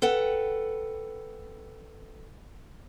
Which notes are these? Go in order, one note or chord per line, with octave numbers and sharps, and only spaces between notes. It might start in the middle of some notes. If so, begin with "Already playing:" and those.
A4 B4 F#5 G5